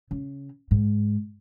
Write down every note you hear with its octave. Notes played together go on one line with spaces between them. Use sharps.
C#3
G#2